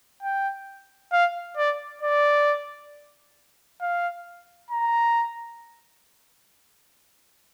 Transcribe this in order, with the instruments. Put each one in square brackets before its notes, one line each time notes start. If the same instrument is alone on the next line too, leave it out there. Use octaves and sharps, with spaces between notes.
[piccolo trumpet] G5
F5
D5
D5
F5
A#5